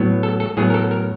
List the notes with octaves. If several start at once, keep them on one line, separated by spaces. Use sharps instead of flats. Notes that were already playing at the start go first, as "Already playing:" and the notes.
Already playing: A2 F#3 B3
A4
A4
A2 F#3 B3 G#4
A#4
A4
A#4